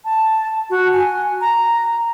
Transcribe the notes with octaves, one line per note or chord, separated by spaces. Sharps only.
A5
F#4
G#5
A#5